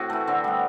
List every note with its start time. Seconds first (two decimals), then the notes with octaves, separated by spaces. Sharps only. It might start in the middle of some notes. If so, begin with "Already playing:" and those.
Already playing: A2 C4 F#4
0.10 E3 A3
0.27 D3 C4
0.44 G3 B3